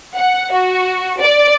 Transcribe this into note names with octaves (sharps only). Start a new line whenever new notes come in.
F#5
F#4
D5